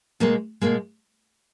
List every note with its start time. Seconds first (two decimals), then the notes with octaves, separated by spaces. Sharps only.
0.20 B2 G#3 A#3
0.61 B2 G#3 A#3